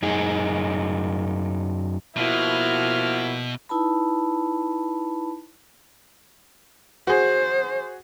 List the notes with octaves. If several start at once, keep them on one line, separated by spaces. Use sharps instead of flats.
F#2 D#4 G#4
B2 F3 A#3 E4 F#4 F6
D#4 E4 B4 A5 B5
F#4 G#4 C5